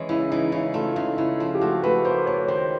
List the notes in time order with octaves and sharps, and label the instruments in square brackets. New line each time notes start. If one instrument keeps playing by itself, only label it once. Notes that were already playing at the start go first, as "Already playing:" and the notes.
Already playing: [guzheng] E3 G#3 C#4
[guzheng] C#3 [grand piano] E4
[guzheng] E3 [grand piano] D#4
[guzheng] C#3 [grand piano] E4
[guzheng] A3 [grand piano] F4
[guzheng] C#3 [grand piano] D#4
[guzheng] C#3 [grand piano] E4
[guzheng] F3 [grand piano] F4
[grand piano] G4
[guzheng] A3 [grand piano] F#4
[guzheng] A3 [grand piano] B4
[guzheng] A#3 [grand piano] C5
[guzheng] A#3 [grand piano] C#5
[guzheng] D#3 [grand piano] C5